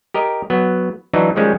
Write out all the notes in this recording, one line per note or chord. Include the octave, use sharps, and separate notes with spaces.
G4 A#4 D#5
F#3 B3
E3 F#3 D4 D#4
D#3 F3 G3 G#3 C#4